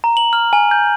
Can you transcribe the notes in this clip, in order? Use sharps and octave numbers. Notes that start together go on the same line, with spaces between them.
A#5
F#7
F6
G#5
G6